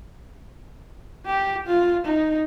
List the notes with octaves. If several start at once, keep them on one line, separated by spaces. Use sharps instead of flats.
G4
F4
D#4